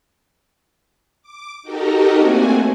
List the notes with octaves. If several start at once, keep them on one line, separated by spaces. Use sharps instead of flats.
D6
D#4 F#4 G4 A4 A#4 D#5
A3 A#3 C4 D4 F#4 G#5